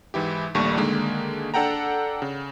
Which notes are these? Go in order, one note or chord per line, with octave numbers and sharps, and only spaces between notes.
G#2 E3 E4 G4
A#1 D#2 G3 A3 C#6
D3 D#3 G#3 A#3
D4 A4 F#5 G5 A#5
C#3